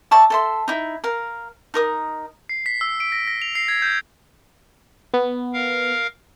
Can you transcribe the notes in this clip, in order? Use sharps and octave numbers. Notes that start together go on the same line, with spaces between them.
D5 E5 A5 C#6
A4 E5 C6
D#4 E4
A#4 F5
D#4 A#4 D#6
C7
B6
E6
D7
A#6
A#6
F7
C7
G#6
G6
B3
A#4 F5